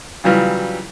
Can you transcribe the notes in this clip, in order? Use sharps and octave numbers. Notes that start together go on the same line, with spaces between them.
C#3 E3 F#3 G3 F4